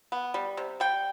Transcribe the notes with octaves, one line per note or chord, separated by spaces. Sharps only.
B3
G3
C3
G3 G5